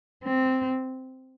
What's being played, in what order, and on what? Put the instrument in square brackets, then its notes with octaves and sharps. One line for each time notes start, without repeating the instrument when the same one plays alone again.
[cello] C4